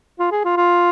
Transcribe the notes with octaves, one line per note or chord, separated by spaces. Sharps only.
F4
G#4
F4
F4